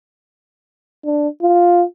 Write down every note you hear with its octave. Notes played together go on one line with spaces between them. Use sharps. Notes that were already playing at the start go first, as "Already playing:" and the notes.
D4
F4